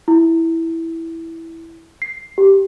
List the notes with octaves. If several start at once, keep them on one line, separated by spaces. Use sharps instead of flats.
E4
C7
G4